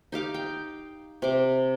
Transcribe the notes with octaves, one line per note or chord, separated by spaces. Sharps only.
D#4 G4 F5 D6
G5
C3 D6